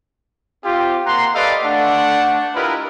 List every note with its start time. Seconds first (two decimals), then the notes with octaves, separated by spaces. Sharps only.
0.64 C4 F4 G4
1.05 A#3 F#5 A#5 C6
1.34 G4 A4 B4 D5 D#5 F5
1.64 A3 D4 F#5
2.55 E4 F4 G4 A#4 B4 D#5